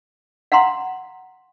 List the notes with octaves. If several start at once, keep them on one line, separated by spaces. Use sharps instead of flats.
F5 F#5 A#5 C6